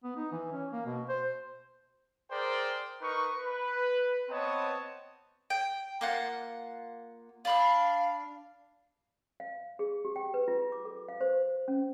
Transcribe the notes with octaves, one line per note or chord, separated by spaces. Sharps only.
B3
D#4
E3
C#4
A#3
B2
C5
G#4 A#4 C5 D5 G5
D#4 A#4 B4 C#6
B4
B3 C4 C#5 D#5 A5
G5
A#3 F4 F#5
D4 F5 B5 E6
F5
G#4
G4
G5
B4
F4
D6
A4
F5
C5
C#4